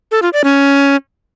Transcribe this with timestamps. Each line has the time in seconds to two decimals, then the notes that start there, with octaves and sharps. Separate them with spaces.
0.11 A4
0.22 F4
0.33 D5
0.44 C#4